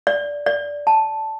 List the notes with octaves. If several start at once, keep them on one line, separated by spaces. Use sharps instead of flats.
D5
D5
A5